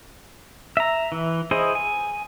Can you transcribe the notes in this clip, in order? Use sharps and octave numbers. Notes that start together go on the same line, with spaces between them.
E5 A#5
E3
E4 G#4 C5 D#5
G#5